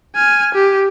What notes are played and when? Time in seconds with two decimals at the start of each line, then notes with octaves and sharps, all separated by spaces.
0.16 G#5 F6
0.54 G4